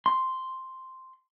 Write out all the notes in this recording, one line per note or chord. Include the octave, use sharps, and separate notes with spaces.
C6